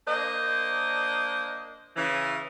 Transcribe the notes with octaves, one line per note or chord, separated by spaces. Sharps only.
A#3 D4 C5 D#5
C#3 E3